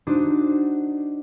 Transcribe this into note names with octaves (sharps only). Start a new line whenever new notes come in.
D4 D#4 F#4 C5